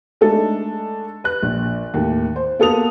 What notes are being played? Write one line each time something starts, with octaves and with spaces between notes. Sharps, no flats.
G#3 A3 D4 D#4 A4
B4 F#6
A#1
D#2 A2
C5
A#3 B3 A4 B4 D#6 F7